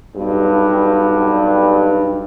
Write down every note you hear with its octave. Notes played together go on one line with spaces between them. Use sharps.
B1 G2